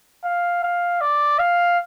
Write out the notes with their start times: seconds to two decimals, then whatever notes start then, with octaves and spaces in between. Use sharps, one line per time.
0.25 F5
0.63 F5
1.01 D5
1.39 F5